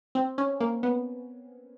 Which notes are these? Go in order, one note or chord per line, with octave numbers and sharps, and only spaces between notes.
C4
C#4
A#3
B3